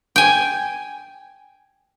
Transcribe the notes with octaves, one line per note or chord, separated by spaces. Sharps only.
G5 G#5